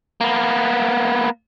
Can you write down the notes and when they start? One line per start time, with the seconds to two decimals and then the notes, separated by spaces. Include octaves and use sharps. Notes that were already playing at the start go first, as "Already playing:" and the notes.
0.21 A#3 B3